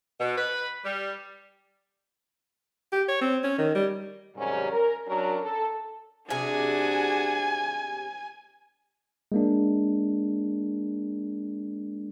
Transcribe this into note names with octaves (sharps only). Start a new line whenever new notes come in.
B2
B4
G3
G4
C#5
C4
C#4
D#3
G3
G#2 C3 D#3 F#3 G3 C#4
A#4
F#3 C#4 D4 A#4
A4
C3 D4 F#4 G#4 G#5
G#3 A#3 D4